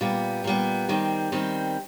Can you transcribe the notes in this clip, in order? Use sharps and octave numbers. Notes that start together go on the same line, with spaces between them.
A#2 G3 B3
A#2 G3 B3
D#3 G3 C4
D#3 G3 C4